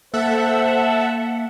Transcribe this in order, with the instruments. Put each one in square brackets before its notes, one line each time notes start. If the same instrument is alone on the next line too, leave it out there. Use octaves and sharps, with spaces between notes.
[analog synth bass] A#3 [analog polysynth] A4 E5 F#5 [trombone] C5